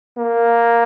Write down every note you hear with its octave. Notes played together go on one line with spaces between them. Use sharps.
A#3